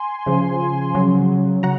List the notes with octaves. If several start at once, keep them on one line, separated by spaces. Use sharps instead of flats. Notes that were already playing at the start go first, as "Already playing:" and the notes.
Already playing: G#5 C6
C#3 F3
C#3 F#3
F#3 F#5 A#5